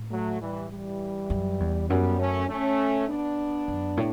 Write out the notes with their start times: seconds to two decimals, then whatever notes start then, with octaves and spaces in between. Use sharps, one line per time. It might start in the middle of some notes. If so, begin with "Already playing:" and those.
Already playing: A2
0.11 F#3 A3
0.41 E3 G3
0.70 E3 G3
1.30 F#2
1.60 E2
1.89 F#2 G3 B3
2.19 A3 C#4
2.49 A3 C#4
3.08 B3 D4
3.68 F#2
3.97 A2